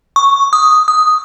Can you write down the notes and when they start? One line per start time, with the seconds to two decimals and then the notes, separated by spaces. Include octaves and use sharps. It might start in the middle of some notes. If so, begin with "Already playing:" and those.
0.16 C#6
0.53 D#6
0.88 D#6